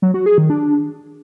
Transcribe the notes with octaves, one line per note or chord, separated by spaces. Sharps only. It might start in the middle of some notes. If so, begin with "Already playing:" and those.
F#3
F#4
G#4
D#3
D4